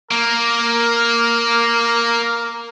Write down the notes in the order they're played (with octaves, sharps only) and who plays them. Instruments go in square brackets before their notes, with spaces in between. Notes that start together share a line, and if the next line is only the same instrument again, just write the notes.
[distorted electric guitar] A#3 [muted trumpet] A#4